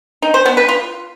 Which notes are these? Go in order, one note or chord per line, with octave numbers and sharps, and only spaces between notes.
D#4
C5
B3
B4
F4